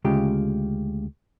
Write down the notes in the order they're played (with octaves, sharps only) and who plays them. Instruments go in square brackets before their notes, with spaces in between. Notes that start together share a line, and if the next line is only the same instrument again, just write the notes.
[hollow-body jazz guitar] D2 C#3 G#3 F4 G4